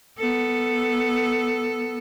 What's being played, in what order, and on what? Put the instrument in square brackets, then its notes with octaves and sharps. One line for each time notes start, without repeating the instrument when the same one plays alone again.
[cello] B3 A4